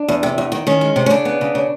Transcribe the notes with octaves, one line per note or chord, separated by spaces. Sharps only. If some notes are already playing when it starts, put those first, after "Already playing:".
Already playing: D4
E2
C3
E2
D#3
D#3 C#4
G#3
C3
C#4
C#3 D4
B3
C#3
C#3